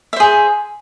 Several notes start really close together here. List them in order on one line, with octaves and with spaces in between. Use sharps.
E5 C5 G#4